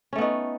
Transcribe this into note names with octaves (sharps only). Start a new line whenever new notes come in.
A3 B3 C#4 D#4